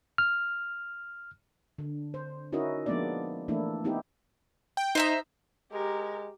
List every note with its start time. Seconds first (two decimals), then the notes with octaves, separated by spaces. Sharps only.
0.18 F6
1.78 D3
2.14 C5
2.52 C#4 D#4 E4 F#4 A#4 D#5
2.86 F3 G#3 A#3 B3 D4 D5
3.48 E3 A3 A#3 D4 E4
3.84 B3 D#4 E4 G4
4.77 G5
4.95 D#4 C5 E5 A#5
5.73 G#3 G4 A#4